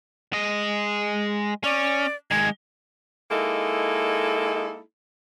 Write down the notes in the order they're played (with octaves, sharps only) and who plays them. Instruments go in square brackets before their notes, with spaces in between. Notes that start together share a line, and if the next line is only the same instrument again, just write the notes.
[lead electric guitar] G#3 D#5
[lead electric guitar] C#4 [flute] D5
[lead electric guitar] D#3 G#3 [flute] G#6
[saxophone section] G#3 A#3 D#4 E4 A4